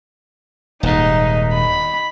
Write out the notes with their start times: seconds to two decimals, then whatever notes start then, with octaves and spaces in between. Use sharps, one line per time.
0.83 D#1 D#2 G#2 D#4
1.53 B5